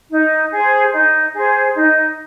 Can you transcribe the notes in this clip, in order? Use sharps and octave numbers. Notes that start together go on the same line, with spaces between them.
D#4
G#4 C5
D#4
G#4 C5
D#4